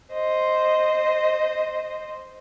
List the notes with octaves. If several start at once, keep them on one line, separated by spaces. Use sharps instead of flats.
C5 D#5